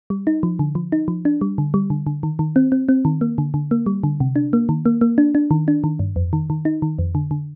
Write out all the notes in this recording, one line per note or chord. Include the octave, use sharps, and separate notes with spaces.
G3
D#4
F3
D3
F3
D#4
F3
D4
G3
D3
G3
D3
D3
D#3
D#3
C4
C4
C4
D#3
A#3
D3
D3
A#3
G3
D3
C3
D4
A#3
D#3
A#3
A#3
D4
D4
D#3
D4
D#3
G2
F2
D#3
D#3
D#4
D#3
F2
D3
D3